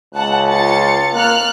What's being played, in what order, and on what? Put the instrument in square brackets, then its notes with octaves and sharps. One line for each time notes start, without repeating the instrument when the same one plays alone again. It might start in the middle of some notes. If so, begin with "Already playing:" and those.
[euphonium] C#2 [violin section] F#5 A5 F#6
[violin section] F4 A6 C#7
[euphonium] A#3 [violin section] F6 F#6